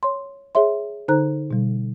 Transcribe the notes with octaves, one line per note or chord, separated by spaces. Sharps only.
C#5 C6
G#4 C#5 E5 C6
D3 D#4 A4 C5 A#5 F#6
B2 G3